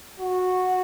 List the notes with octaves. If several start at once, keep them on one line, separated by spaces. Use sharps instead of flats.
F#4